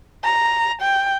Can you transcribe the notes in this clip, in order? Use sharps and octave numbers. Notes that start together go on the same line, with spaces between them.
A#5
G5